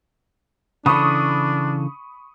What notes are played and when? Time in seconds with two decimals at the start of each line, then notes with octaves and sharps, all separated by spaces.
0.86 C#3 E3 D4 A4 B5 C#6 D#6